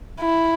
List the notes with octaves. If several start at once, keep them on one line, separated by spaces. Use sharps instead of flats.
E4